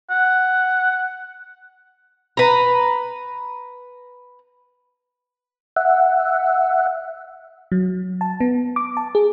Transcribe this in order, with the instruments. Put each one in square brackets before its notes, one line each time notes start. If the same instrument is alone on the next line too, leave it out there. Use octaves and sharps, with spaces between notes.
[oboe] F#5
[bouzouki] B4 A#5
[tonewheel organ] E5 F#5
[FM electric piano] F#3
A5
B3
D6
A5
G#4